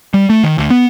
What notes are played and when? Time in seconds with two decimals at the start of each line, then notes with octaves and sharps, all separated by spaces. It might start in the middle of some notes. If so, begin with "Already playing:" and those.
0.14 G3
0.30 A3
0.44 D#3
0.58 D2
0.70 B3